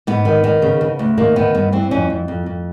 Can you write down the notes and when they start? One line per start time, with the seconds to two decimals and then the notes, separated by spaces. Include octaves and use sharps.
0.07 G#2 B3
0.25 D#3
0.44 D#3
0.62 C#3
0.81 C#3
0.99 D2
1.18 D#3 A#3
1.36 D#3 B3
1.54 G2 B3
1.73 E3 C4
1.91 F2 C#4
2.10 F2
2.28 F2
2.46 F2